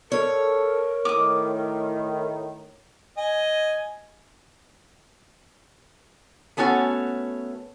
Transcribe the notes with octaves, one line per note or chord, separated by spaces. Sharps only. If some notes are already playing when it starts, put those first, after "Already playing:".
A4 A#4 C#5
A2 D#3 D6 D#6
D#5 G#5
A3 B3 C#4 F#4 A4